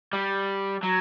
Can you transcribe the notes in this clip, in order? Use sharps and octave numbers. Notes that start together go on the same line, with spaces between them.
G3
F#3